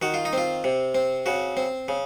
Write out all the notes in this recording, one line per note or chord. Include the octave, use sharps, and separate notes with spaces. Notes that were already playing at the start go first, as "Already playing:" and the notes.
D#3 F#4
F4
D#4
C4 F4
C3
C4
C#3 F#4
C4
C#3